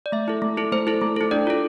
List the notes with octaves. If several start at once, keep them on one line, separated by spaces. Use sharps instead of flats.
D5
A3 E5
E4 A4
A3
E4 A4
A3 C5
E4 A4
A3
E4 A4
D4 D5
F4 A4